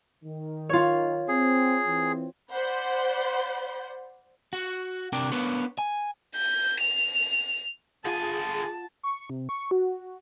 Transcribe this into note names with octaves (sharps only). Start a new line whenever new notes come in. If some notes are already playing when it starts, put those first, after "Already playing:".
D#3
F4 C#5
C4 G#4
E3 C4
C5 D5 F#5 B5 C6 G6
F#4
C3 D4 A#4 D5 G5
B3 D4 A#4 B4 C#5
G#5
G6
F7
D3 F4 G#4 F#5 G#5 A5
C#6
C3
C#6
F#4